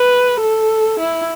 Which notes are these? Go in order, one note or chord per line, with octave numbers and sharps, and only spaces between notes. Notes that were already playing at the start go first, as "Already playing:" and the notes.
Already playing: B4
A4
E4